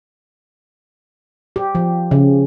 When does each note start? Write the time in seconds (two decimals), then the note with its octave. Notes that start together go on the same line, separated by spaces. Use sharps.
1.56 G4
1.75 F3
2.11 C#3